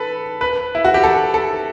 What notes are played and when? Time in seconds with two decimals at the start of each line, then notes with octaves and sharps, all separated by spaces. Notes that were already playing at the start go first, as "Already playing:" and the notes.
Already playing: A4 B4
0.41 B4
0.75 E4
0.85 F#4
0.94 G4
1.03 A4
1.34 A4